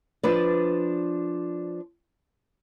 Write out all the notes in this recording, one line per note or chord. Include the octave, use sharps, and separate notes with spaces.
F3 D4 B4 D5